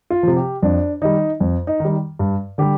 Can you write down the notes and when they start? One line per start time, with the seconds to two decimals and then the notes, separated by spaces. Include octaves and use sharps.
0.10 F4
0.23 C3 F3
0.36 G4
0.63 F2 D4
1.01 D#3 G3 D#4
1.40 F2
1.67 D#4
1.80 D#3 G3
2.19 G2
2.58 D3 G3 G4